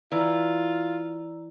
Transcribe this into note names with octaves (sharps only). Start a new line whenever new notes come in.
E3 F4 D5 A#5 E6